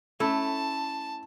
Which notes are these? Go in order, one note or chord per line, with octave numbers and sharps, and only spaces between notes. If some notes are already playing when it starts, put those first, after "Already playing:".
A3 C#4 E4 A5